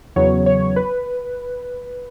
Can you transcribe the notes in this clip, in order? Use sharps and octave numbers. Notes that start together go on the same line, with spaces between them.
E2 C#3 F#3 B3 C#5
C#5
B4